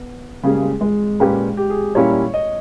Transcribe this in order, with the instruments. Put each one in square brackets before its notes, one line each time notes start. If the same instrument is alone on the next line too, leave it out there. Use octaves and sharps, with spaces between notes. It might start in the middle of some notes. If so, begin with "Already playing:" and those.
Already playing: [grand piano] B3
[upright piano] C#3 G3 A#3 C#4 G#4 [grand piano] G#3
[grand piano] G#3
G#3
[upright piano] A#2 A#3 C#4 G4 B4
[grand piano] G4
G#4
[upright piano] A#2 G3 A#3 C#4 E4 [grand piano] C#5
[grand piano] D#5